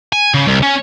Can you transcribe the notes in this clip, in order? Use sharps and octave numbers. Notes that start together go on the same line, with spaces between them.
G#5
C#3
C2
C#4